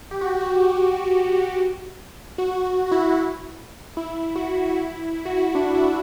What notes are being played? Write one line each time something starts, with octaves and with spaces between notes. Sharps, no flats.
G4
F#4
F#4
G4
F#4
F#4
F#4
E4
E4
F#4
E4
E4
F#4
E4
D4
E4